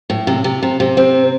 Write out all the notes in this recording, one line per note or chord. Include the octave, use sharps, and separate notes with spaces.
A2
C3
C3
C3
C3
C4